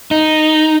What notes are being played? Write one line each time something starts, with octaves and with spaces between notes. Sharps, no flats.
D#4